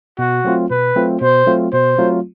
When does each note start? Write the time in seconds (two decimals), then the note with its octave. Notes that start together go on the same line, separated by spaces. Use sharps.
0.19 B2 F#4
0.45 F#3 A3 C4 F4
0.70 B2 B4
0.96 F#3 A3 C4 F4
1.21 B2 C5
1.46 F#3 A3 C4 F4
1.73 B2 C5
1.98 F#3 A3 C4 F4